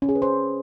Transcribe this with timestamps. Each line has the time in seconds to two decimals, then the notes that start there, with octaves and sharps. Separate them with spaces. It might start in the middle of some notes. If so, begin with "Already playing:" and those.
0.02 C#4
0.09 G#4
0.15 B4
0.22 C5